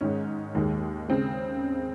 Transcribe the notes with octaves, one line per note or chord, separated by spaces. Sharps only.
G#2 D#3 G#3 C#4
D#2 D#3 G#3
C#3 G#3 C4